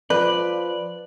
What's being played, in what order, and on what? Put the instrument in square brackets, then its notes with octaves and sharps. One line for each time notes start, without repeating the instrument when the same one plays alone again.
[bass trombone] F3 [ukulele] B4 [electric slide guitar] D5